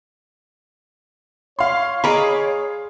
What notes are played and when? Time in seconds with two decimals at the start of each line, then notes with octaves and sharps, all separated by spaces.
1.59 C#5 F5 C6
2.04 G#4 D5 D#5 A#5 B5